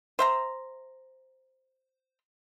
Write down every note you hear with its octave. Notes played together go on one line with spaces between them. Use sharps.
C5 E5 A#5